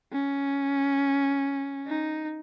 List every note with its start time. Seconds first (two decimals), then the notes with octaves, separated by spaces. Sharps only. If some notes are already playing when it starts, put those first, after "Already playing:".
0.12 C#4
1.86 D#4